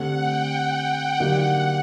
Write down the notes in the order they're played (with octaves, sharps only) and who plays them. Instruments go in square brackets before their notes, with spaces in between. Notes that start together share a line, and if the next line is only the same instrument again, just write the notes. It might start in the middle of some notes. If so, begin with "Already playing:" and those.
Already playing: [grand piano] D3 A3 C4 G4 [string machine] F#5
[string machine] G5
[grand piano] D3 F#3 A#3 D#4 G4 [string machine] F#5